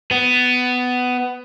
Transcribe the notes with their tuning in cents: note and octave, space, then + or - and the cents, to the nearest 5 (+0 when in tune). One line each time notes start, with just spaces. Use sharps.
B3 +15